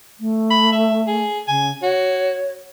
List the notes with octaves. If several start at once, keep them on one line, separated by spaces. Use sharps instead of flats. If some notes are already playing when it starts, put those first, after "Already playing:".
A3
B5
E5
G#4
C#3 G#5
F#4 C#5